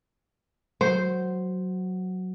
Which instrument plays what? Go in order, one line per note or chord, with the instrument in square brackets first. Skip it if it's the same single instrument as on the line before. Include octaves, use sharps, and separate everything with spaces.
[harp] F#3 [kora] C5